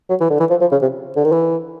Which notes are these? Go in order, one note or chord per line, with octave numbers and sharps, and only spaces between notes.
F#3
E3
D3
E3
F3
F3
C#3
C3
D3
D#3
E3